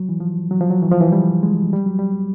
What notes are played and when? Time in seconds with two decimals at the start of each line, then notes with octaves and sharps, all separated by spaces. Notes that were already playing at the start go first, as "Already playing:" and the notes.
Already playing: F#3
0.09 E3
0.20 F3
0.51 F#3
0.61 F3
0.70 F#3
0.82 E3
0.92 F3
1.01 E3
1.12 G3
1.43 G#3
1.73 G3
1.86 F#3
1.99 G3